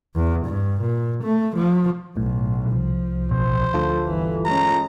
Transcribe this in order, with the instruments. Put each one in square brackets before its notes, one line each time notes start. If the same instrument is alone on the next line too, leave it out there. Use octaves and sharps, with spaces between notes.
[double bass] E2
G2
A#2
A3
F3
[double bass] B1 [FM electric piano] A2
[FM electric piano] C2 [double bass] F3
[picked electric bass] A1 B2 [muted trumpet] C5
[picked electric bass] D2 D3 [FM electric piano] F4 A4
[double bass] G1 E3
[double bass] G#3 C#4 [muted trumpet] A#5